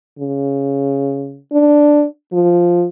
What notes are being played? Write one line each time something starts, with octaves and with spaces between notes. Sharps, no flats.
C#3
D4
F3